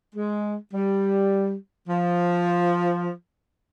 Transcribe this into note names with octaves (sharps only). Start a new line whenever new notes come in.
G#3
G3
F3